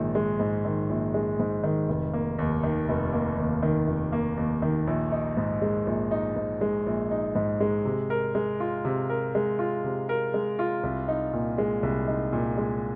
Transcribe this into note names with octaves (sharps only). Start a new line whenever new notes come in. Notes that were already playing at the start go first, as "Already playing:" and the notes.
Already playing: A#1 G#2 D#3 G#3
G#3
G#2
D#3
A#1
G#3
G#2
D#3
F1
A#3
D#2
D#3
F1
A#3
D#2
D#3
F1
A#3
D#2
D#3
A#1
D#4
G#2
G#3
A#1
D#4
G#2
G#3
A#1
D#4
G#2
G#3
C3
A#4
G#3
F4
C3
A#4
G#3
F4
C3
A#4
G#3
F4
C2
D#4
A#2
G#3
C2
D#4
A#2
G#3